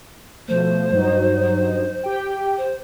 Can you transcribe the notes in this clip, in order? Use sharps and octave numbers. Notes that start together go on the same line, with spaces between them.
B2 F3 A3 C5
G2 F#3 D#4
G4 G5
C5